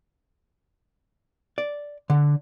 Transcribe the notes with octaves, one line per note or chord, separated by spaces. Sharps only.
D5
D3